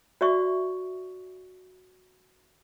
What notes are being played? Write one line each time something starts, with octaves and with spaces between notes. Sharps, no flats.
F#4 D5 E5 C#6